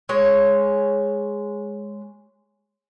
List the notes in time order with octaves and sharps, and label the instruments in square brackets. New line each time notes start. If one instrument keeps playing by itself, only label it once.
[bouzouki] G#3 C#5